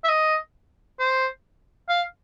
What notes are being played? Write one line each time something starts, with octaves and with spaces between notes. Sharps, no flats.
E5
D#5
C5
F5